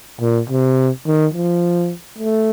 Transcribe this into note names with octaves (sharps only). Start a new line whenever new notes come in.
A#2
C3
D#3
F3
A3